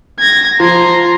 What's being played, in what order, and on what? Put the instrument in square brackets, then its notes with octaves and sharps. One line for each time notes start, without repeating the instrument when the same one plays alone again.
[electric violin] G#6 A#6
[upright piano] F3 [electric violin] A#5 C6